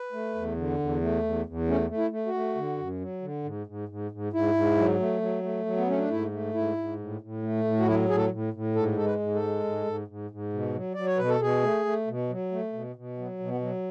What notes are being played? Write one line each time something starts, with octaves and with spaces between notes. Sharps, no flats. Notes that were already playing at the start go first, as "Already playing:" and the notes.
Already playing: B4
A3
E2
D3
E2
A3
E2
E2
A3 C#4
A3
E4
A3
F#4
A3
D3
F#2
F#3
D3
G#2
G#2
G#2
G#2
G#2 E4
G#2
F#3
A3
F#3
A3
F#3
B3
A3 C#4
D4
G#2 E4
A3
G#2 E4
G#2
A2
A2
A3
A2
F#4
F#3 E4
A2 G#4
A4
A2
A2
G#2 A4
G#3 A4
B4
G#2
A4
G#3
G#2
G#2
G#2
G#2
B2
F#3
F#3 D5
C#5
B2 B4
A4
B2 G#4
A3
A3
B2
F#3
A3
B2
B2
F#3 B3
B2
B3
F#3